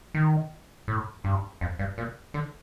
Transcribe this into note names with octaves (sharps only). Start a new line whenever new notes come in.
D#3
A2
G2
F2
G2
A#2
D3